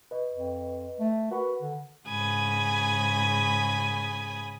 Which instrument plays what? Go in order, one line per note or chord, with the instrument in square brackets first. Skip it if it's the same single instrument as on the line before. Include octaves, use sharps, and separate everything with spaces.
[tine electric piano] B4 D#5
[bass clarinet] F2
A3
[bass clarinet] F#4 [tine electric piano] A#4 B4 B5
[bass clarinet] D3
[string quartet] G#2 C#3 G#5 B5 D#6